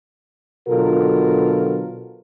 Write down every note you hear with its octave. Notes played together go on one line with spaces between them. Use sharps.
B2 D3 F#3 F4 A4 A#4